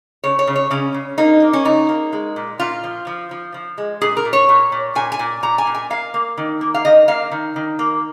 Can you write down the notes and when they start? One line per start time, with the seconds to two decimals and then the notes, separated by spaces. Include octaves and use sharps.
0.24 C#3 C#5
0.39 C#5
0.47 C#3
0.56 C#5
0.71 C#3 C#4
0.94 C#3
1.18 A#3 D#4
1.42 A#3
1.53 C#4
1.65 C#3 D#4
1.89 A#3
2.13 G#3
2.36 A#2
2.60 A#2 F4
2.84 F3
3.07 F3
3.31 F3
3.54 F3
3.78 G#3
4.01 A#2 G#4
4.17 A#4
4.25 A#2
4.33 C#5
4.49 A#2
4.72 A#2
4.95 A#2 G#5
5.12 G#5
5.19 A#2
5.43 A#2 A#5
5.58 G#5
5.67 A#2
5.75 G#5
5.90 A#3 F5
6.14 A#3
6.38 D#3
6.61 A#3
6.74 F5
6.85 D#3 D#5
7.08 A#3 F5
7.31 D#3
7.56 D#3
7.79 A#3